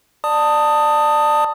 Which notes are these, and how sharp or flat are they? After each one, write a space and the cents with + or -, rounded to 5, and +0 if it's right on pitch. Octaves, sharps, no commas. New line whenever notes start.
D5 +20 A5 +20 D#6 +0